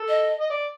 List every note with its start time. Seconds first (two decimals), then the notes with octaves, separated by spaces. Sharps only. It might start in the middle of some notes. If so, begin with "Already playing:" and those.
Already playing: A4
0.08 D#5
0.40 D#5
0.50 D5